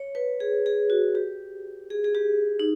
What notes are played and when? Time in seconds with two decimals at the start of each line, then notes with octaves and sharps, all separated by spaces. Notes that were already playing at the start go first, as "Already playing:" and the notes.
Already playing: C#5
0.15 B4
0.40 G#4
0.66 G#4
0.90 F#4
1.15 G4
1.90 G#4
2.04 G#4
2.15 G4
2.60 D#4